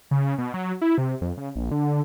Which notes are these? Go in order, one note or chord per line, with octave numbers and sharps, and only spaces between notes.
C#3
B2
F#3
E4
C3
F2
C#3
A#1
D3